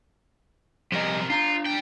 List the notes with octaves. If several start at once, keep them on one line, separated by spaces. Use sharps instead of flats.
C3 F3 G3 A#4 D#5
D4 F4 A#5
G3 G5